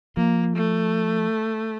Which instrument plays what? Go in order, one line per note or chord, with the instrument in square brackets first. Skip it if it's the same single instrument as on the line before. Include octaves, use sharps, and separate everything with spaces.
[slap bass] F3 [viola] A#3
[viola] A3